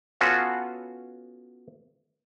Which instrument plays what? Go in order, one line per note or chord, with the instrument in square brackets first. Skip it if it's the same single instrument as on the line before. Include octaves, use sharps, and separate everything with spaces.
[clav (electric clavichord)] B3 C#4 F4 F#4 A4